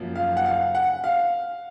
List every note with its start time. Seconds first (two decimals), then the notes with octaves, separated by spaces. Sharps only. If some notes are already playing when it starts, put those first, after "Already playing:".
Already playing: F#2 C#3 F3 A#3
0.16 F5
0.37 F#5
0.46 F5
0.75 F#5
1.04 F5